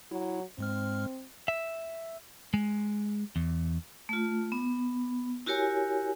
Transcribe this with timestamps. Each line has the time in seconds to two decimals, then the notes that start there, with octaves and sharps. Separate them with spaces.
0.12 F#3 E4
0.58 G#2 G#3 C4 F6
1.48 E5
2.54 G#3
3.36 E2
4.09 A3 F4
4.52 B3
5.46 E4 F#4 G4 A#4 C#5 G#5